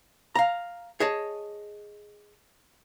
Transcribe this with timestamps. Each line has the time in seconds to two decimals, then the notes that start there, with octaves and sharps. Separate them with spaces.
0.35 F5 A#5
1.00 G#4 C#5 D#5 A5